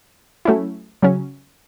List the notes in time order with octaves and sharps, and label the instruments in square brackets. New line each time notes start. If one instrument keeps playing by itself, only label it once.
[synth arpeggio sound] F#3 A3 C#4 E4
C#3 F#3 C#4